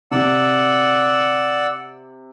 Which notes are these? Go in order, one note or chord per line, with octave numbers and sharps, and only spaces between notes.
C3 D5 F#5 E6